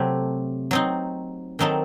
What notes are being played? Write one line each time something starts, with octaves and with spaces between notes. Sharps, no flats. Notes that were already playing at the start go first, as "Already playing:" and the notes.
Already playing: C3 F#3 A3 C4
F#3 C4 D#4
D#3 F#3 C4 D#4 A4